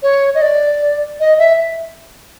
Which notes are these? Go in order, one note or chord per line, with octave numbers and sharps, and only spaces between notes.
C#5
D#5
D5
D#5
E5